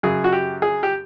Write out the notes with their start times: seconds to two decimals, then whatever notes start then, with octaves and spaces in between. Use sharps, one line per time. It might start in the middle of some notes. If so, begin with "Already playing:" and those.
0.03 F#2 C#3 F#3 G#4
0.24 F#4
0.32 G4
0.62 G#4
0.83 G4